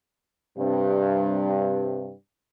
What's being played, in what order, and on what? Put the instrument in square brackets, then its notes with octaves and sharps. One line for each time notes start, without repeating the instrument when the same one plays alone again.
[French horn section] G2 C3